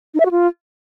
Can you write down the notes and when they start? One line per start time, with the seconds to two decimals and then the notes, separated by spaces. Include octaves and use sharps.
0.14 D#4
0.20 E5
0.26 F#4
0.31 F4